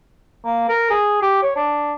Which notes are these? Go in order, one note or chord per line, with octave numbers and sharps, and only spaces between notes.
A#3
A#4
G#4
G4
C#5
D4